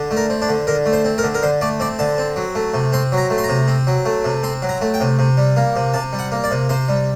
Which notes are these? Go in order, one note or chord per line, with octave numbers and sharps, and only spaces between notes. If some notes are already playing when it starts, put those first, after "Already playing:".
Already playing: D3
A3
A#4
C4
D4
D3
D3 A#4
A3
C5
C4
A#4
D3
A#4
D3 C5
A3 D5
C4 D5
D3 A5
C4
F#3
A3
C3
C4 C6
F#3
A#5
A3
C6
A#5
C3
C4
F#3
A3
C3
C4 C6
F#3
A#5
A3
G5
C3
C3
G3
A#3
C3
C3 A5
G3
F#5
A#3
D5
C3
C3 C5
G3